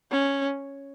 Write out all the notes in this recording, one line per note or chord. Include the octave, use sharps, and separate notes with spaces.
C#4